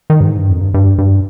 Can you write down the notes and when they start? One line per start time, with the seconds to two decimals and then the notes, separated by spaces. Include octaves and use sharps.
0.10 D#3
0.20 G2
0.25 G#2
0.38 G2
0.49 F2
0.61 G2
0.74 G2
0.98 G2